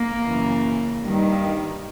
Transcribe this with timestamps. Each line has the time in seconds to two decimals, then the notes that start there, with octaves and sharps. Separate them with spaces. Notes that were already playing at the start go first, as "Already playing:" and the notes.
Already playing: A#3
0.23 F#2 C#3 E3
1.03 G2 D#3